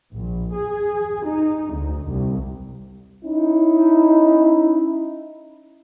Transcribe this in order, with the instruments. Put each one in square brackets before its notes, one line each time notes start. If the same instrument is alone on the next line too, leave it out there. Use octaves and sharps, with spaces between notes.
[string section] A#1
G#4
D#4
D2
C2
[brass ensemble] C#4 D#4 [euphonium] E4